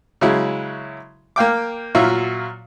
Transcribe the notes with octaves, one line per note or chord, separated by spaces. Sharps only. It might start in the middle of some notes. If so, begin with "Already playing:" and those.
C#3 F#3 G#3 E4
A#3 F5 G5 D6
A#2 F#3 F4 F#4 E5